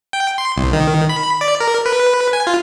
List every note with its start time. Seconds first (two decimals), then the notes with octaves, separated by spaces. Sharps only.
0.13 G5
0.38 C6
0.56 C2
0.73 D#3
1.09 B5
1.41 D5
1.60 A#4
1.86 B4
2.33 G#5
2.47 F4